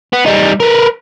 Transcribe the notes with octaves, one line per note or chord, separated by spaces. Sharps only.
B3
G3 D#4
A#4 B4